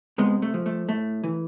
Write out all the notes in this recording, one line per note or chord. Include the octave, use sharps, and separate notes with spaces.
C3 G#3 B3
A3
F3
A3
A2 A3
E3